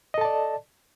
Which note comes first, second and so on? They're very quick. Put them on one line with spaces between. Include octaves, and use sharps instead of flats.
D#5 A4 A5 D5